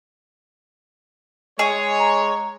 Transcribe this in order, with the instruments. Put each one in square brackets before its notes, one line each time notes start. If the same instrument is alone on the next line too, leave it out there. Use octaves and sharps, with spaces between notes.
[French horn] G#3 [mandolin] G#4 [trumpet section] C#5 [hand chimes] D#5
[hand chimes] A#5